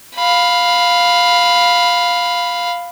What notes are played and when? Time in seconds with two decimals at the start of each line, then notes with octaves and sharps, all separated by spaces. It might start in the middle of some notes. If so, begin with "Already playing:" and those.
0.16 F5 B5